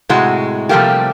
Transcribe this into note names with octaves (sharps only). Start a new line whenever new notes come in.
A2 C3 G#3 F#4
C3 F3 G3 A3 A#3 G4